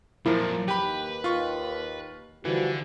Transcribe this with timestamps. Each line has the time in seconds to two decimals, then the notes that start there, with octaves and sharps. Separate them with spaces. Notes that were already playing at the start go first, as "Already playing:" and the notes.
0.26 F2 A#2 F3 F#3 E4 A#4
0.68 D#2 G4 B4 B5
1.24 F4 C#6
2.45 D3 E3 F3 G3 F#4